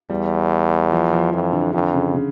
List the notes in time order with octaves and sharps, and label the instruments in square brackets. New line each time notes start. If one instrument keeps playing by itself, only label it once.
[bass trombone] E2 [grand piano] G3
[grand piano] F3
F3
[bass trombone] F2 [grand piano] E3
[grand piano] D3
[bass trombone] F2 [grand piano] D3
[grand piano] C#3
C#3